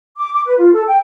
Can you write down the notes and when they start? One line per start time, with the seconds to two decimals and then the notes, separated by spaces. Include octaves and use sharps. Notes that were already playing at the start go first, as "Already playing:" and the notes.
0.17 D6
0.33 D6
0.46 B4
0.59 F4
0.73 A4
0.87 G5